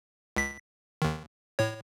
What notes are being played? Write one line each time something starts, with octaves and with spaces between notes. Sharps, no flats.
C#2 B6
D#2 D#3
A2 C#5